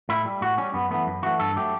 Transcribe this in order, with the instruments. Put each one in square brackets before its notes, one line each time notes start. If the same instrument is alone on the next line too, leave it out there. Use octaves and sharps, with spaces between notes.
[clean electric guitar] A2 E4
G3
A2 F#4
G3 C#4
F#2 B3
E3 A3 B3
F#2
E3 A3 F#4
G2 A4
F#3 A3 G4